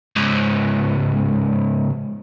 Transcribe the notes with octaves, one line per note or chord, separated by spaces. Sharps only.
C#2 G#2